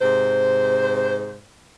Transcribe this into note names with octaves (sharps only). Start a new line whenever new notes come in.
G#2 C3 C5